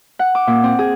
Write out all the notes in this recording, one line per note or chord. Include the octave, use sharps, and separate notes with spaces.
F#5
D6
A#2
C4
G#4